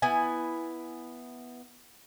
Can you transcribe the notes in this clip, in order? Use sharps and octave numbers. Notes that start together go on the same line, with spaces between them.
B3 E4 G#5